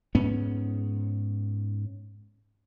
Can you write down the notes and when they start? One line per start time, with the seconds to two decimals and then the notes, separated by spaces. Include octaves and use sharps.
0.15 G#2 B3 C#4